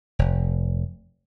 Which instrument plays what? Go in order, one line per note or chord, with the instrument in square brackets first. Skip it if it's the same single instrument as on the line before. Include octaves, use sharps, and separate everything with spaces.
[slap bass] F1